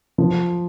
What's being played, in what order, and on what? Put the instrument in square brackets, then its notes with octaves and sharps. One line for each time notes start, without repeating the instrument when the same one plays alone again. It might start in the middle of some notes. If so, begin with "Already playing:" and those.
[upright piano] F3